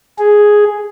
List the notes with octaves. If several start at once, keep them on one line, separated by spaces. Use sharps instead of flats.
G#4